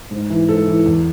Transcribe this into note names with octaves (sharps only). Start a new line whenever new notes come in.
G#2
E3
G#2 A4
E3
E2